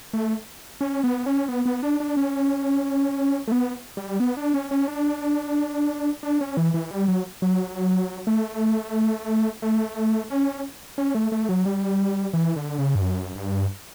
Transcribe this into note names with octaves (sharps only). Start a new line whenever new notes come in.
A3
C#4
B3
C#4
B3
B3
D4
D4
C#4
A3
B3
G3
B3
D4
C#4
C#4
D4
D4
C#4
E3
E3
G3
F#3
F#3
A3
A3
C#4
C#4
A3
A3
F#3
G3
E3
D3
C#3
G2
F#2
G2